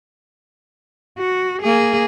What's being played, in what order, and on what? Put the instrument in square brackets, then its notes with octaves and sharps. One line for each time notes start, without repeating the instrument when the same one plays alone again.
[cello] F#4
A#3 G#4